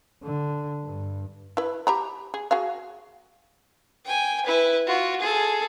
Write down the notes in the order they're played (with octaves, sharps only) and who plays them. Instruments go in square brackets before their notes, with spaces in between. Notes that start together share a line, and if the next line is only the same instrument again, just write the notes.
[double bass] D3
G2
[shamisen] E4 B4
G4 A#5 B5
G#4
F#4 G#4 F5
[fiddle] G5 G#5
E4 B4
F4 F#4
G#4 A4